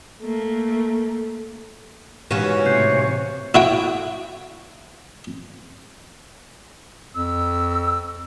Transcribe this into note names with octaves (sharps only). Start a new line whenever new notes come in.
A3 A#3
G#2 C#3 E3 C#4 F#4 G4 D#7 E7
A2 C3 C#5 F#6 G6 C7
E4 F#4 G5
F2 E6